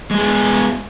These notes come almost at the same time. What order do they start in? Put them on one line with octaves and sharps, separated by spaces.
G#3 G#4 B3